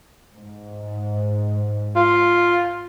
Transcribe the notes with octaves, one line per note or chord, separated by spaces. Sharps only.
G#2
F4